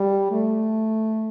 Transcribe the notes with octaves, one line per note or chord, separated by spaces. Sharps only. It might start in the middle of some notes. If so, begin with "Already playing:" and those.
Already playing: G3
A3